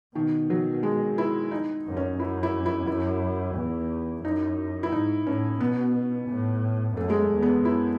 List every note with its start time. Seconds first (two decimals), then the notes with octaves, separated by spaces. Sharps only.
0.15 B2 D#3
0.50 F#3
0.83 G#3
1.18 E4
1.51 D#4
1.86 F#2
1.97 C#4
2.20 F#2 E4
2.43 E4
2.66 E4
2.87 F#2 E4
3.56 E2
4.23 F#2 D#4
4.83 E4
4.92 G#2 D#4
5.26 A2 C#4
5.60 B2 B3
6.29 A2
6.96 F#2 A3
7.10 G#3
7.19 A3
7.31 E2
7.42 B3
7.64 F#2 E4